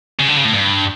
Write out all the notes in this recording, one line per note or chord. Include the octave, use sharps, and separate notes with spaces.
C#3
D3
C#3
A2
G2